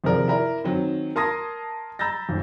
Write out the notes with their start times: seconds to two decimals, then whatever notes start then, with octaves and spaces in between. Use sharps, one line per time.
0.04 D#2 C3 F3 G#4 A#4 D5
0.28 E4 A#4 D5
0.64 D#3 F#3 C4
1.16 A#4 A5 C6 D#6 G#6 A#6
1.99 A#5 B5 E6 G6 A6 A#6
2.29 D#1 G#1